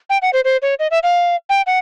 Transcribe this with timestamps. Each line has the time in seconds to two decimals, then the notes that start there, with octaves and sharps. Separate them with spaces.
0.10 G5
0.22 F#5
0.33 C5
0.45 C5
0.62 C#5
0.79 D#5
0.91 E5
1.03 F5
1.50 G5
1.67 F#5